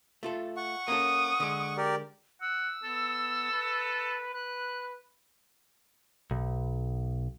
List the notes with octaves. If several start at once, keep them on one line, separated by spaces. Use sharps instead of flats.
A3 F4 A4
F#5 C#6
A#3 C#4 A4 D#6
D3 G#3
G4 A#4 D5
F#5 E6
B3 A4
B4
B4 F#6
B1